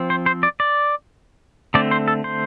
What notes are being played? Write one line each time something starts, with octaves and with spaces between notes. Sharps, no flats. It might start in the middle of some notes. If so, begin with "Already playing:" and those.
Already playing: F3 C4
C5
C5
D5
D5
D3 A3 C4 D5
C5
A4
C5